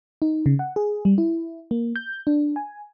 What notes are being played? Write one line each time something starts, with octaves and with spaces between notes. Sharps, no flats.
D#4
C#3
F#5
G#4
G3
E4
A#3
G6
D4
G#5